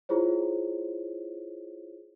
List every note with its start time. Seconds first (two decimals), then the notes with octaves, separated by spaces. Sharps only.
0.09 E4 F4 G#4 C5 C#5